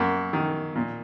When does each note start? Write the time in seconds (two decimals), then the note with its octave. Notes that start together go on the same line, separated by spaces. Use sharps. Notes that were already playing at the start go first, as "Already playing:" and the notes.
Already playing: F#2 A#3
0.33 D#3
0.75 A#2